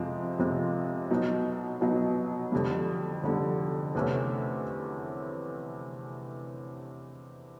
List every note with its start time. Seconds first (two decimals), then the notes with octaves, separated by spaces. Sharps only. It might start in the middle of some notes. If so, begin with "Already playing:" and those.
Already playing: F2 C3 F3 G#3 C4
0.39 F2 C3 F3 G#3 C4
1.11 B2 F#3 B3 D#4
1.81 B2 F#3 B3 D#4
2.52 F2 D3 G3
3.24 F2 D3 G3
3.95 E2 C3 E3 A3 C#4